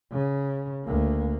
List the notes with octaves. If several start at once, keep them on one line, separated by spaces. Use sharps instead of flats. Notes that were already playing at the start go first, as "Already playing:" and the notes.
C#3
D2 A#3